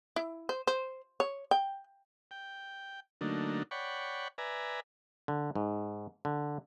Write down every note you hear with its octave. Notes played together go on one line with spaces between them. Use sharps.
E4
C5
C5
C#5
G5
G5
D3 F#3 A3 A#3 D4 D#4
C#5 D5 F#5 G5 B5 C#6
B4 D5 E5 G#5 A#5
D3
G#2
D3